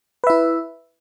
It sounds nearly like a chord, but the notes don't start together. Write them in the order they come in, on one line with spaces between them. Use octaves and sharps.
B4 E5 E4